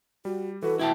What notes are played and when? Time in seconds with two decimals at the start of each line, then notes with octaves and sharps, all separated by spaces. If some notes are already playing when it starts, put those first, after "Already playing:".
0.25 G3 F#4
0.62 E3 F#4 A4 B4
0.79 E4 E5 G5 A5